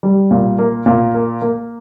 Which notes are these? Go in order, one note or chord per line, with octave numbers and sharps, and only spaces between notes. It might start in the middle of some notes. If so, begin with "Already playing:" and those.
G3
A#2
A#3
A#2
A#3
A#3